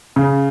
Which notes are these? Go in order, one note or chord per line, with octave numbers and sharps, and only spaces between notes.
C#3